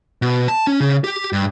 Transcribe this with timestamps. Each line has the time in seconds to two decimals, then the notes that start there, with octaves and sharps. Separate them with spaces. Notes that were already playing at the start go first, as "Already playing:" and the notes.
0.22 B2
0.48 A5
0.67 C#4
0.80 C#3
1.04 G4
1.33 G2